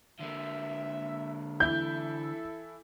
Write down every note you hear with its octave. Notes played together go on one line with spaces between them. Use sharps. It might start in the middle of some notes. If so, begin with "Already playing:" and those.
D3 A#3 E5
E3 E4 A4 G6